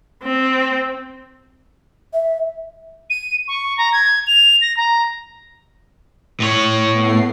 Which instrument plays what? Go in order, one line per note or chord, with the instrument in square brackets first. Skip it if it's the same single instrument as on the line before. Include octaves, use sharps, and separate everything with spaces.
[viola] C4
[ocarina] E5
[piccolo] D#7
C#6
A#5
G#6
F7
A#6
A#5
[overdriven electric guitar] A2 C#5
[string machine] A3 B3 C7